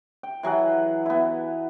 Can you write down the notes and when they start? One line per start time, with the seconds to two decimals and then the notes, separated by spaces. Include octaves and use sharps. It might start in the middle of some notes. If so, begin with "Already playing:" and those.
0.23 G5
0.43 E3 F#3 G#4 F#5
1.06 B3 E4